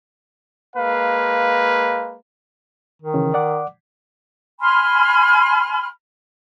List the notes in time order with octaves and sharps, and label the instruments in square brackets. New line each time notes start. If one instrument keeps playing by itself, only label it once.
[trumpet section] G#3 A#3 B4 F5
[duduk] D#3
[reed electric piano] C#3 E3 C#4
D5 F#5 D6
[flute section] G#5 B5 C6 F6